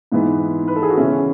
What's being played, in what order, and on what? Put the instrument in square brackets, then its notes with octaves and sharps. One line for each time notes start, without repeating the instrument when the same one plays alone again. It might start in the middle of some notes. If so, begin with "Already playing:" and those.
[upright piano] G#2 E3 B3 D#4
B4
A4
G#4
F#4
C#3 E3 B3 C#4 E4